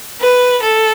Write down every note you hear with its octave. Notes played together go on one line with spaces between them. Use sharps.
B4
A4